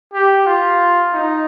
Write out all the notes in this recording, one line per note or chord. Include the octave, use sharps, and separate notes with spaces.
G4
F4
D#4